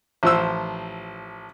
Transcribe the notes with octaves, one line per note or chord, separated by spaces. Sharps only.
A1 F3 C5 E6